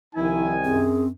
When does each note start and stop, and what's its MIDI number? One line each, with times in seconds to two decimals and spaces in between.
0.15 0.87 36
0.15 0.87 51
0.15 0.55 53
0.15 0.53 64
0.15 0.87 80
0.64 1.12 42
0.64 1.08 60
0.64 1.04 68